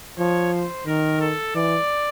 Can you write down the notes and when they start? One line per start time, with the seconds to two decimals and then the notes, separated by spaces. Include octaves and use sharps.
0.18 F3 C#5
0.53 C5
0.86 D#3 A#4
1.21 A4
1.55 E3 D5